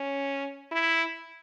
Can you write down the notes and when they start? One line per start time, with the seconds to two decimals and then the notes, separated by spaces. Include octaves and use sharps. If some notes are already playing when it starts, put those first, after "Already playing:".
Already playing: C#4
0.72 E4